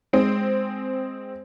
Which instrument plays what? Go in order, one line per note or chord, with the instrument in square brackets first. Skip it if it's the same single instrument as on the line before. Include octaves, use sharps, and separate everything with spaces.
[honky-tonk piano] G#3 C4